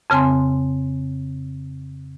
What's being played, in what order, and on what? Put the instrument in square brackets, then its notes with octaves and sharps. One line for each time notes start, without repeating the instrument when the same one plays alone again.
[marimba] F2 C#3 C4 G#5 C6